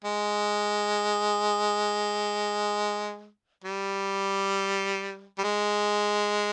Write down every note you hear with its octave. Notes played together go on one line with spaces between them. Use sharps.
G#3
G3
G3
G#3